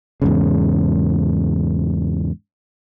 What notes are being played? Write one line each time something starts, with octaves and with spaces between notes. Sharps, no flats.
E2 G#2 C#3